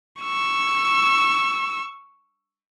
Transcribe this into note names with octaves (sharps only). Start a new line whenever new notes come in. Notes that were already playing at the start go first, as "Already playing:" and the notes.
C#6 E6